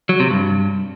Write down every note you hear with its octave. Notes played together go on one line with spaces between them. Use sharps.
F#3
C3
G2